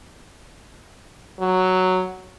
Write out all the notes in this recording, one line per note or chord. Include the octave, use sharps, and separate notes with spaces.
F#3